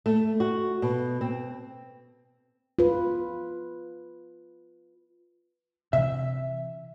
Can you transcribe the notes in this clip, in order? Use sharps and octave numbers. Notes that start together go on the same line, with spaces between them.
A3
F#4
B2
C4
F4 B4
C3 E3 E5